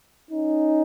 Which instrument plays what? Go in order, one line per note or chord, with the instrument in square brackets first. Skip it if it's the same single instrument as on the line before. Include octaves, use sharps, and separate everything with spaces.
[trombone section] C#4 D#4